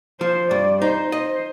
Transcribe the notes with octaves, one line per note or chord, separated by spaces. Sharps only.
F3 C5
G2 D5
D#4 C5
C5 D#5